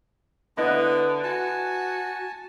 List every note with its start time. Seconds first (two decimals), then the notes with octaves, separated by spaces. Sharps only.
0.57 D3 B3 E4 B4 D#5 F#5
1.24 F#4 G#5 A5